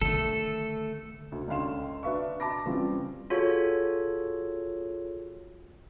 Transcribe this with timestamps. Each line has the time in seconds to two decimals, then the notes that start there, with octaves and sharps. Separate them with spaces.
0.01 D3 D#3 A3 A4
1.32 D2
1.48 C#2 D3 C#4 F5 C6 E7
2.03 D4 B4 E5 F5 C#6
2.40 A5 B5 D6 A#6
2.66 C#3 E3 G3 C4 F4
3.30 F4 F#4 G#4 A4 C#5